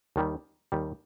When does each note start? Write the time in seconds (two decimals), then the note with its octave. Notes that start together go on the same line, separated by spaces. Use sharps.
0.16 D#2 D#3 G3
0.72 D#2 D#3 G3